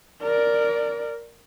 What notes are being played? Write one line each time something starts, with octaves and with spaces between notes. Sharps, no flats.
A#4 D5